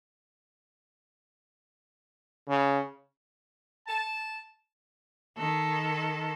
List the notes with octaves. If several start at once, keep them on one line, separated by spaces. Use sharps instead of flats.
C#3
A5
D#3 A4